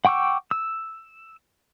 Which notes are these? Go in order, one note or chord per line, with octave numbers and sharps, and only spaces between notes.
F#5 G5 C#6 D6 E6
E6